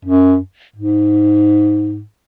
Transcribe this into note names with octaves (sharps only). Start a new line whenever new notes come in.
F#2
G#2